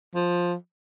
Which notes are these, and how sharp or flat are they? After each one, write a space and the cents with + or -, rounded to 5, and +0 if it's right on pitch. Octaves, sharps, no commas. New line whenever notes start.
F3 +10